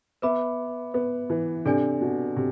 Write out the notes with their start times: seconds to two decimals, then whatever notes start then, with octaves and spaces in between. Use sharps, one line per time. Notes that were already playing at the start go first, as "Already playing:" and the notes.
0.22 B3 B4 E5 B5 D6
0.94 B3
1.30 E3
1.65 C3 D4 A4 D5 G#5
2.01 B2
2.36 C3